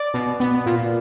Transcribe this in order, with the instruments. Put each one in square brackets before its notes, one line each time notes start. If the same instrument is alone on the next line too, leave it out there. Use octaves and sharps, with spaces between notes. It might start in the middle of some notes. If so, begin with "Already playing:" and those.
Already playing: [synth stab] D5
B2
B3
A#2